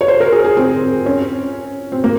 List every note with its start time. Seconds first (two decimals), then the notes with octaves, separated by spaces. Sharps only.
0.01 C#5
0.08 C5
0.20 A#4
0.32 G#4
0.44 G#4
0.57 C4
1.06 C#4
1.92 C4
2.04 A#3